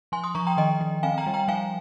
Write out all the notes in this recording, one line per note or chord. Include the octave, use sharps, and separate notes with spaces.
F3 G#5 C6
C6 D#6
F3 A#5 C#6
G5 A#5
D#3 D#5 G5
D#3
C4 F5 G#5
G5 A#5
G3
G5 A#5
F3 F5 G#5